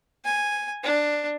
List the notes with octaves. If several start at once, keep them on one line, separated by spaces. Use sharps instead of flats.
G#5
D4